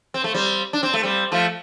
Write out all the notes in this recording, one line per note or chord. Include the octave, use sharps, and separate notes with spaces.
C4
A3
G3 C4
D4
C4
A3
G3 C4
F3 A3